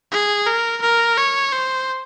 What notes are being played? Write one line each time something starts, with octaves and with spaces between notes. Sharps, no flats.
G#4
A#4
A#4
C#5
C5